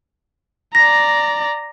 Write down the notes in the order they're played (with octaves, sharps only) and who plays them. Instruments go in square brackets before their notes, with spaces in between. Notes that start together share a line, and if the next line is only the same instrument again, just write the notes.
[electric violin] D5 A#5 [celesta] A#6